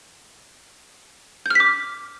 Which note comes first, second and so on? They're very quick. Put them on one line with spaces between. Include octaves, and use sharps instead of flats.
G6 F6 B6 D6